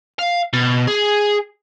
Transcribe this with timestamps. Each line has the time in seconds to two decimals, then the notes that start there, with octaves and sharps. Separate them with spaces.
0.19 F5
0.53 B2
0.88 G#4